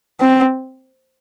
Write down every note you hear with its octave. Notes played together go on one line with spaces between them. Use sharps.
C4